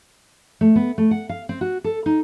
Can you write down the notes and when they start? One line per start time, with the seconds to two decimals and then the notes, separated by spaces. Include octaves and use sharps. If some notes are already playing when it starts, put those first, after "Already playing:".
0.61 A3
0.76 B3
0.98 A3
1.11 F#5
1.29 F5
1.49 C4
1.61 F#4
1.84 A4
2.06 D#4